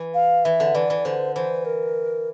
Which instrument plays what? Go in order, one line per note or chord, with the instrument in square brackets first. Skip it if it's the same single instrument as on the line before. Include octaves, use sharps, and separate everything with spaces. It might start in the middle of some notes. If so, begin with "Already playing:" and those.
Already playing: [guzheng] E3
[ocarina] F5
[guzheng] E3 [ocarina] E5
[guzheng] D3
[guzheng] E3 [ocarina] D5
[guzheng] E3
[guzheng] D3 [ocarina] C5
[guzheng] E3 [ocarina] C5
[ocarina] A#4